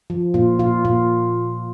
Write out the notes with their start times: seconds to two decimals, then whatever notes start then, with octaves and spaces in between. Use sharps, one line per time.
0.10 F3
0.34 A#2 F4
0.59 A#2 F4
0.85 A#2 F4